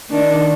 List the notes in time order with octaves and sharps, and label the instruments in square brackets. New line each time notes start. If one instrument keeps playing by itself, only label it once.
[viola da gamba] D#3 [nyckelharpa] D4